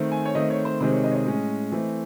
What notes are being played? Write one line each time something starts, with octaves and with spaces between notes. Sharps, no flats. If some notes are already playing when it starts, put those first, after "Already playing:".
Already playing: D#3 A3 C4
G#5
C#5
D#3 A3 C4 D#5
C#5
C5
C3 D#3 G#3 C4 C5
C#5
D#5
C#5
D#5
A2 G#3 C#4
E3 A3 C4